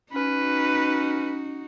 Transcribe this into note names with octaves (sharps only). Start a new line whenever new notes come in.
C#4 D#4 F#4 B4